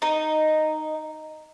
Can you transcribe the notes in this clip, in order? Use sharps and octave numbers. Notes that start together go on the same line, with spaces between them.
D#4 D#5